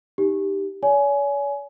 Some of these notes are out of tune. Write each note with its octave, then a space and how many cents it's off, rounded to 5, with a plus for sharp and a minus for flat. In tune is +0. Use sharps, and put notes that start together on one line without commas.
D#4 +0 G4 +0
C#5 +45 G#5 +15